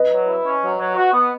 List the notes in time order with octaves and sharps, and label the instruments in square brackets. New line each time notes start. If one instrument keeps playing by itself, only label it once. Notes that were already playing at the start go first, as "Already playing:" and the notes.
Already playing: [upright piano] B4 D#5
[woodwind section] F#3
E4
C#4
F#3
F#3
F#4
B3